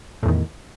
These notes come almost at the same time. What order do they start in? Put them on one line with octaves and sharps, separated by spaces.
A2 E2 D#3